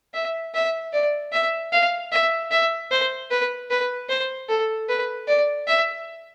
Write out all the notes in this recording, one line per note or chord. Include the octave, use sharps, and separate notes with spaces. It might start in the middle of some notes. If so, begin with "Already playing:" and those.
E5
E5
D5
E5
F5
E5
E5
C5
B4
B4
C5
A4
B4
D5
E5